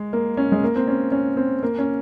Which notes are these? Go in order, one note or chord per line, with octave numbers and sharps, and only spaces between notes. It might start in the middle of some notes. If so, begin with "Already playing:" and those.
Already playing: G#3
A#3
C#4
G#3
A#3
C4
C#4
C#4
C4
A#3
C#4